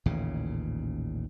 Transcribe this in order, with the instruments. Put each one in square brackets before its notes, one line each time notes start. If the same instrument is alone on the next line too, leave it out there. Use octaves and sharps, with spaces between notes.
[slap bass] A1 D#2 A#2 C#3